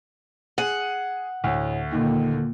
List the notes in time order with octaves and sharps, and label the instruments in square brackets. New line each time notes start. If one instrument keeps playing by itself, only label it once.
[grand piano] G#4 D#7 [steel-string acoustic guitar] F#5
[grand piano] D2 [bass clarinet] A2
[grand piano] D#2 D#3 [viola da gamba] A#2 [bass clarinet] D3